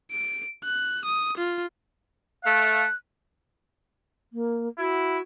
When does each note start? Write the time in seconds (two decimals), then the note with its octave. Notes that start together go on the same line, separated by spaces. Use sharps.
0.12 D7
0.64 F#6
1.05 D#6
1.37 F4
2.44 A3 F5 F#6
4.33 A#3
4.78 E4 F#4